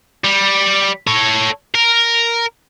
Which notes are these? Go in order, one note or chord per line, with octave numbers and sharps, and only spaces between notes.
G3
A4 C#5
A#4